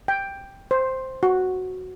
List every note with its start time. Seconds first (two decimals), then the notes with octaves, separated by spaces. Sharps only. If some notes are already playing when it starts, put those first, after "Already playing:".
0.08 G5
0.71 C5
1.23 F#4